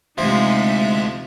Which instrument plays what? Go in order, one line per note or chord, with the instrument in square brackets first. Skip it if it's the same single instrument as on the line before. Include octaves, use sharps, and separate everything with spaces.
[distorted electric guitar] D2 [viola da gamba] C3 D#4 [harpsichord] F3 [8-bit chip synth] G#3 E5